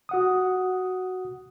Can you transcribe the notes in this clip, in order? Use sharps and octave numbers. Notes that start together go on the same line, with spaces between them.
F#4 F#5 D#6